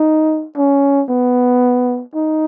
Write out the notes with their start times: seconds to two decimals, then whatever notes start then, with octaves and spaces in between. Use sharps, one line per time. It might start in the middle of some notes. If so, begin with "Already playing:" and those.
Already playing: D#4
0.57 C#4
1.09 B3
2.14 D#4